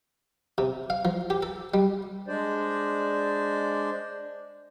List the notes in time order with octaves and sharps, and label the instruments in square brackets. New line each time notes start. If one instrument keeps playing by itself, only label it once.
[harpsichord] C3
F5
F3
G4
A4
G3
[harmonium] G#3 D4 C5 D5